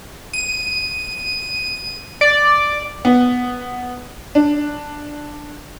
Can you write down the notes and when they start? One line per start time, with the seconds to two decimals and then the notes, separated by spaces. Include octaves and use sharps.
0.33 D#7
2.21 D5
3.05 B3
4.35 D4